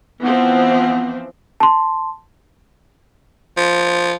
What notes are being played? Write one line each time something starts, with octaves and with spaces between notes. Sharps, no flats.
E3 F3 B3 C4
A5 C6
F3